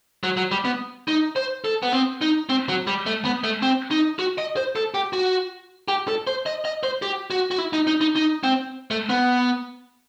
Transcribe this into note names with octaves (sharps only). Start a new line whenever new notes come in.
F#3
F#3
G3
B3
D#4
C5
A4
B3
C4
D#4
C4
F#3
G3
A3
B3
A3
C4
D#4
F#4
D#5
C5
A4
G4
F#4
G4
A4
C5
D#5
D#5
C5
G4
F#4
F#4
E4
D#4
D#4
D#4
D#4
C4
A3
B3